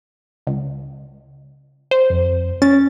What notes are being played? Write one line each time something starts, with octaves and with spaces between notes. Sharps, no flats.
C#2
C5
F2
C#4 A6